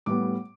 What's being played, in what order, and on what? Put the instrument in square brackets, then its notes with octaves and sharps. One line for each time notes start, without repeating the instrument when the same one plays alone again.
[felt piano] A2 G3 B3 D6